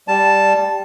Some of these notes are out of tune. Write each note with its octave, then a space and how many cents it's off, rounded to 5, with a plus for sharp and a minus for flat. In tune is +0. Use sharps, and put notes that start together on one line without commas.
G3 +0 A5 +0